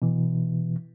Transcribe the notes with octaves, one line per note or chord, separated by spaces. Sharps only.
B2 E3